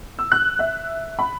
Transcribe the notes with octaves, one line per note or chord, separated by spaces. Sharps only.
E6
F#6
E5
B5